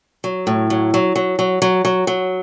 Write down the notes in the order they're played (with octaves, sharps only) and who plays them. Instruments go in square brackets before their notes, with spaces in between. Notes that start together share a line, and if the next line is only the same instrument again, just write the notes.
[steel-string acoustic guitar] F#3
A2
F#3
F#3
F#3
F#3
F#3
F#3
F#3